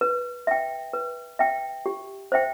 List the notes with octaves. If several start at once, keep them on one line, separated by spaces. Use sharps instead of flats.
B4
E5 G5
B4
E5 G5
G4
C5 E5 G5